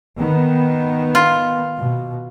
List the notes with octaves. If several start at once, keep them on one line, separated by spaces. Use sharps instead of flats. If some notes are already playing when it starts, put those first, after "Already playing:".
D#3 B3
F4
B2